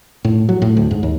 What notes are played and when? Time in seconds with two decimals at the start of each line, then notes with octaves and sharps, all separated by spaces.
0.25 A2
0.49 F#3
0.62 A2
0.77 D2
0.91 G#2
1.03 D#2